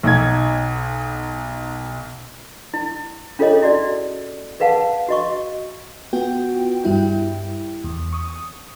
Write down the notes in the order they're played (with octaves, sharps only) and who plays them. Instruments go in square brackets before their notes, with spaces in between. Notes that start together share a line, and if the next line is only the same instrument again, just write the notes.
[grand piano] B1 D#4 G#6
[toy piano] E4
C#4 F4 G#4 A4 C#5 D#5
E4 F#4 D5
G#4 B4 F5 F#5 A5
F#4 D#5 C#6
[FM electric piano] B3 F4 F#4 G5
G2 G3 E4 G5
E2
C#6 D#6